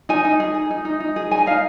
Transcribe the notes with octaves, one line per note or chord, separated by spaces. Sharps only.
D#4 G#5
D#4
G#4
G#4
D#4
D#4
D#4
G#4
D#4 G#5
D#4 F5